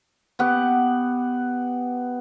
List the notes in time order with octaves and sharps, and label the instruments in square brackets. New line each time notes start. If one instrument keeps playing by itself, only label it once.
[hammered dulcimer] B3 G4 F#5